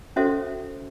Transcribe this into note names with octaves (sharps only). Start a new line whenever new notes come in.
C#4 F#4 A4 C5 E5